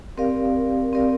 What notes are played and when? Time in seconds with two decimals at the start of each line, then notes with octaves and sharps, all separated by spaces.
0.18 C4 G4 A#4 D5 F5
0.93 C4 G4 A#4 D5 F5